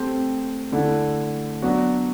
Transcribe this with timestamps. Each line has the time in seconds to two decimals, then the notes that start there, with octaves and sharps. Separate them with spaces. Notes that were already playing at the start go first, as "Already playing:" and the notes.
Already playing: A3 C4 G4 C5
0.72 D3 A3 E4 A4
1.62 F#3 B3 D4 F#4